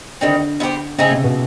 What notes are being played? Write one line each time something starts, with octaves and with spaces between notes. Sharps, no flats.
D3 D#3 G3 C4
B3 E4 G4 C5
C#3 A3 C4 D#4 G#4
C3
B2